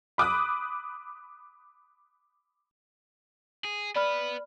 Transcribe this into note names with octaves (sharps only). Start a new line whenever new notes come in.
B5 D6 D#6 F#6
G#4
B3 B4 D5 B5 F6